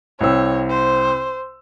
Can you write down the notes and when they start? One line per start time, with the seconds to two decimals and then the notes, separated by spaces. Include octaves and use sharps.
0.21 C2 C4 C#5 E6
0.70 C5